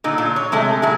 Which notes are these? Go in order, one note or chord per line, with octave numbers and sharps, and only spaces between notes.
A#2 D3 D#4
A#2 F4
C#5
C3 G#3 A3
A#2 F#3 G#4